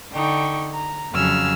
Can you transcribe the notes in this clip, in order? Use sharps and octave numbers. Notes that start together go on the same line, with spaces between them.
D3 D#4 G5 C#6
A#5
F2 C#3 F#3 G#5 E6 F6